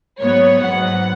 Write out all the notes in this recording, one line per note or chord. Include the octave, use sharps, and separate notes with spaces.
G#2 F#3 B3 C#5
G#2 F#3 B3 F#5